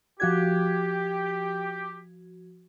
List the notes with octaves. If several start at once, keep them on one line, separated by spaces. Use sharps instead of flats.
F3 F#4 G4 G#6